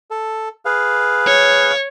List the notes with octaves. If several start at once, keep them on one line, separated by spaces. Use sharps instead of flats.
A4
G#4 B4 F5
C#5